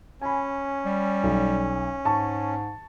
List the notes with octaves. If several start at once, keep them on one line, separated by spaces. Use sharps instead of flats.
C#4 G#5 B5
G3
B1
G#2 A5 C#6